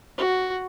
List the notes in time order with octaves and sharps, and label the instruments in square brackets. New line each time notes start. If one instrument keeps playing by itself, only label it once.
[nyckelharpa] F#4